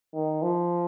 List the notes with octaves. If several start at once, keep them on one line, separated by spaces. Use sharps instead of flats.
D#3
F3